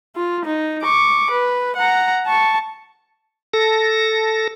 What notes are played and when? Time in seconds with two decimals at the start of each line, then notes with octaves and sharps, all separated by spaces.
0.16 F4
0.45 D#4
0.82 C#6 D6
1.31 B4
1.76 F#5 A#5
2.27 A5 C#6
3.54 A4 A#6